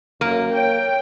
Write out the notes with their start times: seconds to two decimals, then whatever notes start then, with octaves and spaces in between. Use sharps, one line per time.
0.21 F#2 A#3
0.53 C#5 G5